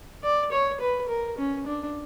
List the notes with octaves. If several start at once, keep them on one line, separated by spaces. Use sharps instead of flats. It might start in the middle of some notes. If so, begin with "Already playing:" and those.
D5
C#5
B4
A#4
C#4
D4